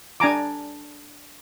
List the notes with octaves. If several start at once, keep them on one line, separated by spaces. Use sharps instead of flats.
D4 G#5 A#5 D6